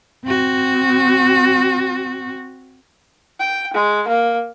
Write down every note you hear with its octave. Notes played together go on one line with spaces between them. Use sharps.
C4 F#4
G5
G#3
A#3